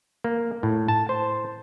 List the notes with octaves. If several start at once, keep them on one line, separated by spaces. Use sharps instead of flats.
A#3
A2
A5
C5